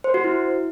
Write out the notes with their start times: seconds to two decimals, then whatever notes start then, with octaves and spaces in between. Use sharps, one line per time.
0.04 C5
0.14 F#4
0.24 E4